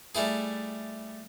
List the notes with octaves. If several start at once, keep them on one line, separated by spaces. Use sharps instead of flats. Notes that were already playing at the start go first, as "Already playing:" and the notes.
G3 A3 E4 G#4